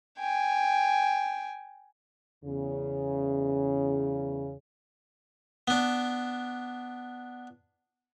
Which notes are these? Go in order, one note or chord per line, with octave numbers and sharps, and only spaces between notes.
G5 G#5
E2 C#3
B3 D4